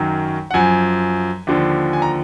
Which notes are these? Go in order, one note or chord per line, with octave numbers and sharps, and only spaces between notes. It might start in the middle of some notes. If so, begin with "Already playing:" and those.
Already playing: F#2 D#3 F#3
F#5
F#2 F3 G#5
D#2 D3 F3
G#5
A#5